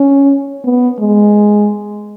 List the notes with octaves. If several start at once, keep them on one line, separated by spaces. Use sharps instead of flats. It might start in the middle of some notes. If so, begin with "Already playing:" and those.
Already playing: C#4
B3
G#3